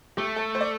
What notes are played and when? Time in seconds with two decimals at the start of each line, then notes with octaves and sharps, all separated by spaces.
0.17 A3 G4
0.36 A4
0.55 C5
0.61 D5